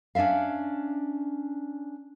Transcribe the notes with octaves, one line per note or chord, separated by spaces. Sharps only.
C#4 D4 D5 E5 F5